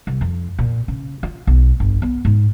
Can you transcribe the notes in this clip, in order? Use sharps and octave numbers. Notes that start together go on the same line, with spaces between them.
C2
F2
A#2
C#3
F4
B1
G1
B3
G#2